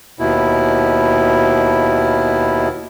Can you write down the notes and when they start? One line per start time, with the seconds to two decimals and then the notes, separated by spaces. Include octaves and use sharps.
0.19 D#2 B2 E4